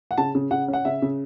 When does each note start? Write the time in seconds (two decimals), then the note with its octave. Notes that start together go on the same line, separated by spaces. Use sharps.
0.11 F#5
0.18 C#3 A5
0.35 C#3
0.51 C#3 F#5
0.68 C#4
0.73 F#5
0.85 C#3 E5
1.02 C#3